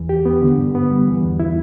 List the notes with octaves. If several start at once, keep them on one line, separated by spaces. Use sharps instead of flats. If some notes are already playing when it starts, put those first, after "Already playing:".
Already playing: E2 E3
G4
B3
D3
G2
B3
G3
E3
E2
E4